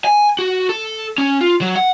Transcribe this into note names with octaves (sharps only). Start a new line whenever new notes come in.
G#5
F#4
A4
C#4
F4
F#3
F#5